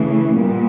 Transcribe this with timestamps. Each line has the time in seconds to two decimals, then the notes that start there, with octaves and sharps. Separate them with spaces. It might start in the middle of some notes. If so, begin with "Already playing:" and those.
Already playing: C#3 E3 A3
0.34 A#2 G3 B3